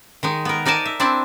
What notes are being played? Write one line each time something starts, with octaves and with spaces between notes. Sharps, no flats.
D#3 G#3 D#4
B3 A#4
D#4 A#4 D5 G#5 A5
E5
C4 D4 E4 D5